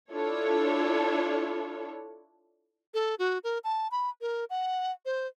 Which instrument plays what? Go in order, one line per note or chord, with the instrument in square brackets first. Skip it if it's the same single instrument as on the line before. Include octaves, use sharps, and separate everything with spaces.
[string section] D4 E4 F4 A4 C#5
[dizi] A4
F#4
A#4
A5
B5
A#4
F#5
C5